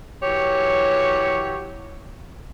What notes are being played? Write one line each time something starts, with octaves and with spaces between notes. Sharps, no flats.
E3 F#3 G4 C#5